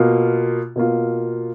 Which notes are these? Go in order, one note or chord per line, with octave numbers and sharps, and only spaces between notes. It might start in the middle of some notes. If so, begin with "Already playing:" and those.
Already playing: B2 A#3 F4
B2 A#3 F4